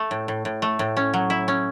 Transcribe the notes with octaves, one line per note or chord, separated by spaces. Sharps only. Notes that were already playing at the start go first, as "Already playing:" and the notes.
Already playing: A3
A2
A2
A2
A3
A2
C#4
F#3
E4
C#4